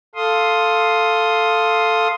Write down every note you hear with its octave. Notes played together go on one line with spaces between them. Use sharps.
A4 F5 C6 D#6